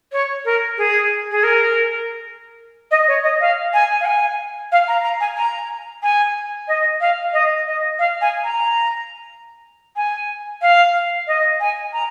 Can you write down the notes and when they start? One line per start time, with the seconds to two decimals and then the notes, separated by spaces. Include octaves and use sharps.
0.12 C#5
0.45 A#4
0.77 G#4
1.31 G#4
1.43 A#4
2.91 D#5
3.07 C#5
3.23 D#5
3.40 F5
3.73 G#5
4.00 F5
4.05 G#5
4.72 F5
4.88 A#5
5.03 A#5
5.20 G#5
5.37 A#5
6.02 G#5
6.68 D#5
7.00 F5
7.33 D#5
7.66 D#5
7.99 F5
8.21 G#5
8.44 A#5
9.96 G#5
10.61 F5
11.27 D#5
11.60 G#5
11.93 A#5